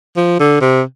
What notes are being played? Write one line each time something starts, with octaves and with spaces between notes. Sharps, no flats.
F3
D3
C3